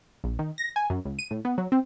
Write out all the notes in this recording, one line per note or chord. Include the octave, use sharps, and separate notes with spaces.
A#1
D#3
A#6
G#5
F#2
C#2
D#7
A2
B3
F#3
C4